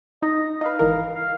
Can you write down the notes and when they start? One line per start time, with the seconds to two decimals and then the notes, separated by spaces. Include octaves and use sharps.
0.22 D#4 D#5
0.61 D#4 B4 F5
0.79 G#1 E3 A#4
1.15 F5